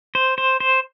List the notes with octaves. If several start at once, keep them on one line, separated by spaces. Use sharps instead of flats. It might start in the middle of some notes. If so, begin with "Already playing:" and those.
C5
C5
C5